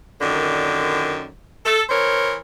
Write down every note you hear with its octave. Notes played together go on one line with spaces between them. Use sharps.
F#2 A#2 D3 D#3
A4
E3 A#4 C5 C#5